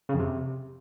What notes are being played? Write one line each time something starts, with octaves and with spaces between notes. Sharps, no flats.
C#3
F2
C3